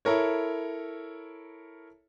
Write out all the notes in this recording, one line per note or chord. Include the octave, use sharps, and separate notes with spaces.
E4 A4 A#4 C#5